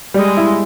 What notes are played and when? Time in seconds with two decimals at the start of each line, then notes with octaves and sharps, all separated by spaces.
0.14 G3 G#3
0.37 E4